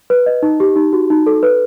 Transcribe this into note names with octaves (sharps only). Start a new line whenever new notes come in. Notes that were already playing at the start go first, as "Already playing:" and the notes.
B4
D#5
D#4
G4
D#4
F#4
D#4
A4
B4